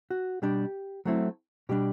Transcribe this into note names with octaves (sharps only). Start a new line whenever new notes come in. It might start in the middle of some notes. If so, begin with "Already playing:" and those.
F#4
B2 G3 D4 G4
F#3 A3 C4 E4
B2 G3 D4 G4